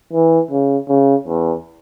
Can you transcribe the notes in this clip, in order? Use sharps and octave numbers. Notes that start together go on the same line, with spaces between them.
E3
C#3
C#3
E2